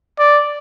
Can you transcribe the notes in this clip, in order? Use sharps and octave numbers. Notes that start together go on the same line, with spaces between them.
D5